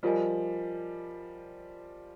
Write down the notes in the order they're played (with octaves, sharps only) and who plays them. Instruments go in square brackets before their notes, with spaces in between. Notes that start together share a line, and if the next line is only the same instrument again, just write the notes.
[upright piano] F3 G3 [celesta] F4 A#4 D#5 G#5